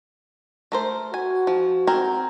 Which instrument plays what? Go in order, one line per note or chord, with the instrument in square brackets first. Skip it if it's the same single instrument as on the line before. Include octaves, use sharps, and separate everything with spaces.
[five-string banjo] A3 A#4 C5
[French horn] F#4 [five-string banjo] G#5
[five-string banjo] F3
C4 A#4 G#5